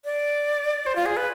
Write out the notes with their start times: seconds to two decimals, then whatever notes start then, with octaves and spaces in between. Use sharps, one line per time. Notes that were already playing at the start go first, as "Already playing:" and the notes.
0.05 D5
0.86 C5
0.96 F4
1.06 G#4
1.17 B4